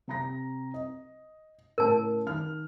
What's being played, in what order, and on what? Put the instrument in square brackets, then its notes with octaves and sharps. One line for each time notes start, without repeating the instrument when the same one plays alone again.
[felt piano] C3 A#5 A#6
D#5
[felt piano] A2 C#3 [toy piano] A#4 A5
[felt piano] D#3 F6